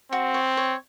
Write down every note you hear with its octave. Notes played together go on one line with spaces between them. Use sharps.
C4 F#4
C#5
C#5